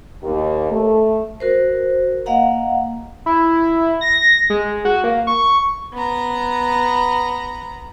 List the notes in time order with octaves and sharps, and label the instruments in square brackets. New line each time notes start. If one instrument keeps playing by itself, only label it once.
[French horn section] D#2
A3
[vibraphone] F#4 A#4 C5
A#3 D#5 F5 F#5 A#5
[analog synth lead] E4
A#6
G#3
F#4
A#3
C#6
[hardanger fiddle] B3 A#5